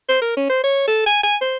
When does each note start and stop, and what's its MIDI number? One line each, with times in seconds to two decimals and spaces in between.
0.09 0.21 72
0.22 0.37 70
0.37 0.46 61
0.50 0.64 72
0.64 0.87 73
0.87 1.01 69
1.06 1.18 80
1.23 1.36 80
1.41 1.57 72